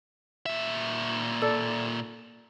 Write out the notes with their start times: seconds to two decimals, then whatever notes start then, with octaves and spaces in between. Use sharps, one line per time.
0.46 A#2 E5
1.42 A4 D5